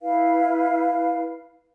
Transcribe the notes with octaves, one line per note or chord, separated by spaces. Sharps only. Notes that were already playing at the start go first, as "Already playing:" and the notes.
E4 B4 F5